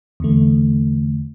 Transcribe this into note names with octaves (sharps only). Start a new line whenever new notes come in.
E2 D3 A3